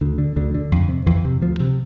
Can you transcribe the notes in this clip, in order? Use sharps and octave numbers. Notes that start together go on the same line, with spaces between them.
D2 D3
D3
D2 D3
D3
F2
C3
F2 E3
C3
D2 F3
C3